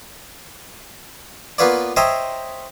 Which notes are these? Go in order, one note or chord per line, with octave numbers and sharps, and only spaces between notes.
A#3 B3 F4 B4 C#5 D5
C5 C#5 D#5 E5 G5 A#5